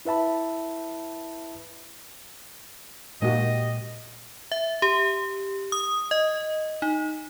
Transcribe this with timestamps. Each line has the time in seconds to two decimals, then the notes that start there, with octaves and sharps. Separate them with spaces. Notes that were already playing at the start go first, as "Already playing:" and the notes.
0.05 E4 B4 E5 A5 B5
3.22 A#2 G#3 A#3 D#4 F#4 G4 D#5
4.52 E5
4.82 G4
5.72 D#6
6.11 D#5
6.82 D#4